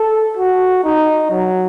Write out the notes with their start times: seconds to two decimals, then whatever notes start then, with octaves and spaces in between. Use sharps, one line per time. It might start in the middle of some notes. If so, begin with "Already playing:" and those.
Already playing: A4
0.37 F#4
0.84 D#4
1.31 F#3